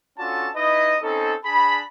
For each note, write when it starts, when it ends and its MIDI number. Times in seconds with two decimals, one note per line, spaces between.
0.18 0.48 61
0.18 0.48 62
0.18 0.48 65
0.18 0.48 66
0.18 0.48 69
0.18 0.48 81
0.55 0.96 63
0.55 0.96 64
0.55 0.96 71
0.55 0.96 75
1.02 1.34 60
1.02 1.34 61
1.02 1.34 63
1.02 1.34 69
1.44 1.82 62
1.44 1.82 68
1.44 1.82 81
1.44 1.82 83